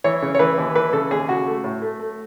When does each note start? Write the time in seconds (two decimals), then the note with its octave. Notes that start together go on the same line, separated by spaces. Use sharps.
0.04 E3 C#5
0.22 C#3
0.35 C#5
0.39 E3 B4
0.58 D#2
0.75 E3 B4
0.93 C#3 A4
1.11 D#2 G#4
1.28 C#3 F#4
1.47 A3
1.64 A2
1.82 A3
2.00 A3